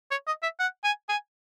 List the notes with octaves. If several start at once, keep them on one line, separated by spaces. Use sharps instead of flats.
C#5
D#5
E5
F#5
G#5
G#5